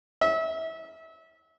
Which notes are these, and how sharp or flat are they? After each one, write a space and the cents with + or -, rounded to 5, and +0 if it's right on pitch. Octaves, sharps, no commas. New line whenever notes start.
E5 -30